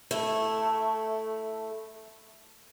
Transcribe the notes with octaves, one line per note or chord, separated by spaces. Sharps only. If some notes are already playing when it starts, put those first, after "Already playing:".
A3 E4